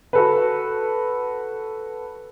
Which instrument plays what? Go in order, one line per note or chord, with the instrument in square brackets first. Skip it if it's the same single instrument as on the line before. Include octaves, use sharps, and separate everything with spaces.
[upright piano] F#4 A4 B4